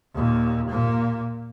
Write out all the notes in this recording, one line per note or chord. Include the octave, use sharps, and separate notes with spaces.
D#2 A#2
A#2 A#3